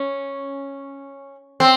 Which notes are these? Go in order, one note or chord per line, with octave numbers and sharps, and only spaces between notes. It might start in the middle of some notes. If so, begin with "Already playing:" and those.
Already playing: C#4
C4